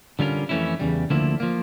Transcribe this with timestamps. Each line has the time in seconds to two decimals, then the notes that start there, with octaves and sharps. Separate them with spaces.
0.19 D3 G3 C#4 F4 A#4
0.49 F2 E3 A3 C#4 E4
0.80 E2 C#3 G3
1.10 D2 D3 F3 A#3 E4
1.40 F3 A#3